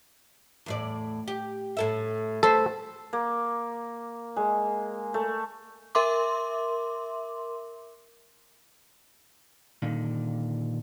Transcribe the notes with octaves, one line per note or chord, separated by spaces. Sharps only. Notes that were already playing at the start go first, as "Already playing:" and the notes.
E2 A2 D5
G4
A2 A4 E5
A3 A4 B4 C5
A#3
G#3
A3
A#4 E5 C6 D6
A#2 D3 D#3